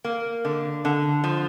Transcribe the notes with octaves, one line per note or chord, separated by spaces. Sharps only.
A#3
D3
D3
F3